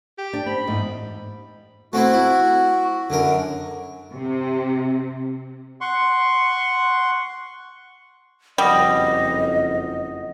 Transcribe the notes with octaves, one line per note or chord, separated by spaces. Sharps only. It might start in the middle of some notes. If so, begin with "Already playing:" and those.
G4
D4
C4 B5
E2 G#2 D#4
A3 C4 E4 F#4
E4
F#2 D3 A#4
C3
F#5 C6 C#6
F#1 F2 G3 D#5 F#5 D#6 A#6